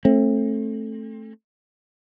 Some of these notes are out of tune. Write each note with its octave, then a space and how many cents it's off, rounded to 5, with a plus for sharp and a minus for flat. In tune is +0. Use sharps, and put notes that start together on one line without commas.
A3 +0 C4 +35